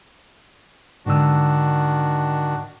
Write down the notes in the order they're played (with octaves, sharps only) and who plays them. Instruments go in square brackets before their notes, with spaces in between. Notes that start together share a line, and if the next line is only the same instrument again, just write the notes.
[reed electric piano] G#2 D3 E6 [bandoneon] D#3 D4 F#4